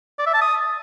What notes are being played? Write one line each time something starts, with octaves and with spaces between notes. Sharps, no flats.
D5
E5
A5
D#6